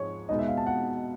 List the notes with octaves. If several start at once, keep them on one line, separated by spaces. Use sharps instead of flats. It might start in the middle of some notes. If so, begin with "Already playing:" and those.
Already playing: G#2 F3 G#3 C#5
B2 G#3 B3 D#4 D#5
E5
F5
A5
F#5